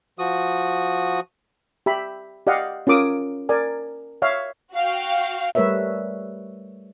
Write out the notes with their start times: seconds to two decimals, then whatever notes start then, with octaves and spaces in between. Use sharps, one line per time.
0.19 F3 F#4 D#6
1.86 G4 E5 B5
2.47 G4 D5 D#5 F5 F#5
2.87 C#4 F4 A#4 D6 D#6
3.49 A#4 D5 G#5
4.22 C#5 E5 F5
4.74 F#4 F5 G5
5.55 G3 A3 A#4 B4 C#5 E5